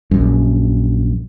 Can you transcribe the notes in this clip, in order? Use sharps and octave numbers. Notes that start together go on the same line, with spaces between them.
A#1 F#2